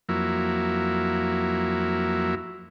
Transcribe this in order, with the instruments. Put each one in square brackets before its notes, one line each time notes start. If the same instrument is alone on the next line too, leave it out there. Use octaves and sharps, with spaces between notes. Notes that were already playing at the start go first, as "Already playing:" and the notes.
[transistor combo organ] F2 F#3 A#3 E4